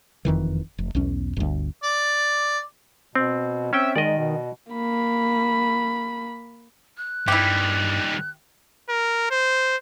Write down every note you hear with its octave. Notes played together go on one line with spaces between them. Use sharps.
F#1 F2 D#3 E3
F1
B1 E2 C#4
G1 D2
D5
B2 C4
C4 C#4 E5 G5
D#3 G#3 D5 D#5
B2
A#3 B5
F#6
G2 D#3 G3 E4 G4
A#4
C5